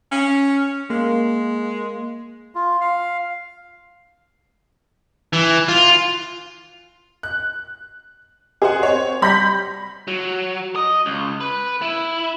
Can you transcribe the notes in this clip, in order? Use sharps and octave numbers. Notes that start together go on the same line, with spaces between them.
C#4
G#3 A#3
F4
F5
E3
F4
F#6
G#4 C5 F#5
C4 C#5
G3 B5 G6 A#6 B6
F#3
D#5
C#2
B4
E4